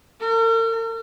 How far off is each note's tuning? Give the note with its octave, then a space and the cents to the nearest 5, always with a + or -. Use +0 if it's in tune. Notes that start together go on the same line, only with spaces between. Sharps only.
A#4 -45